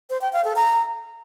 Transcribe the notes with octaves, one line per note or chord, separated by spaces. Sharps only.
C5
G5
F5
A4
A#5